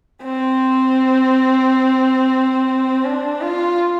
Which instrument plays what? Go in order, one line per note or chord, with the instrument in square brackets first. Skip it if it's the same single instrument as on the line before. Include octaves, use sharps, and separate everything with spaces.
[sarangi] C4
D4
F4